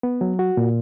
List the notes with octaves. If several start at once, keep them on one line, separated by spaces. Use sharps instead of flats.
B3
F#3
F#4
A#2